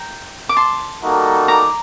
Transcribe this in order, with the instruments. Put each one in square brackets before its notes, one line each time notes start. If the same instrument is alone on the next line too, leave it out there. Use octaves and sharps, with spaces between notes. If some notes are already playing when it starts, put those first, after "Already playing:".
Already playing: [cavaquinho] G5 A#5
D6
A5 C6
[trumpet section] G3 A#3 D#4 F#4 A4
[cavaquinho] A#5 D6